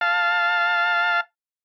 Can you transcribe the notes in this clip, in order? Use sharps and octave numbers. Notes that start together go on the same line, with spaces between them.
F5 A5